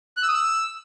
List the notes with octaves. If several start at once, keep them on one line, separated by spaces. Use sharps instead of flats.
F#6
E6
D#6
E6